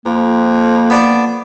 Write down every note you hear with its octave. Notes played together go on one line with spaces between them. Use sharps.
F2 A#3
B3 D4 D5